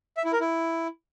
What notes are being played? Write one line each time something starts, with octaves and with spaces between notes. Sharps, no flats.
E5
E4
A#4
E4